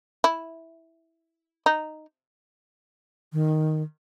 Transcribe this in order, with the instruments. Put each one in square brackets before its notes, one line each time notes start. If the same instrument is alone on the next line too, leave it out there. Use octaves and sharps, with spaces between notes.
[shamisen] E4
D#4
[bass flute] D#3